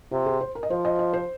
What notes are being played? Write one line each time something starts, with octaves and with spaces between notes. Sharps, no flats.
C3 F4
G#4
C5
A#4
D#5
F3 C5
D#5
D#5
C5